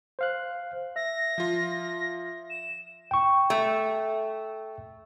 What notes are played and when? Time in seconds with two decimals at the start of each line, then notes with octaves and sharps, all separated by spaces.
0.19 C5 F5 F#6
0.96 E5 A#6
1.38 F3 F4
2.50 E7
3.11 G5 C#6
3.50 A3